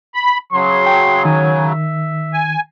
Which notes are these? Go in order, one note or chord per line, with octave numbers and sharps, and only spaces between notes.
B5
C#3 F#3 C6
G5
D#3 G#5
E5
G#5